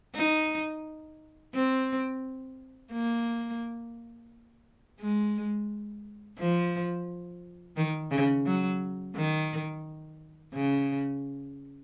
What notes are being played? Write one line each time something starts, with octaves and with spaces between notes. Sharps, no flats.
D#4
C4
A#3
G#3
F3
D#3
C#3
F#3
D#3
C#3